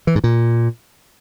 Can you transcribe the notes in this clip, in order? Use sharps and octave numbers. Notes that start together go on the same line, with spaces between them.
E3
G#2
A#2